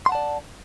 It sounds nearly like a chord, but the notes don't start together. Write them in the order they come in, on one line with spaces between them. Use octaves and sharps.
C6 F#5 A5 D5